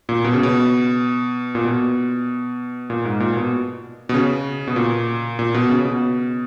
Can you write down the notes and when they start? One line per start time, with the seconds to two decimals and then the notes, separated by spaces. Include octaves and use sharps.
0.09 A#2
0.24 B2
0.34 C#3
0.43 B2
1.55 A#2
1.65 B2
2.90 A#2
3.05 G#2
3.20 A#2
3.36 B2
4.09 B2
4.14 C#3
4.67 B2
4.76 A#2
5.39 A#2
5.54 B2
5.70 C#3
5.85 B2